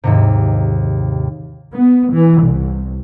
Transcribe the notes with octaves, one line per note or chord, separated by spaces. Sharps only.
D#2 G#2 C3
B3
E3
C2